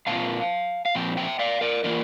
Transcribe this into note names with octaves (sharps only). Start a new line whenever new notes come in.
A#2 F3 C4 F4 F5 A5
F5
A#2 F3 C4 G5
E5 G5
D5 F5
A#4 D5
E3 A#3 F4 A#4 D5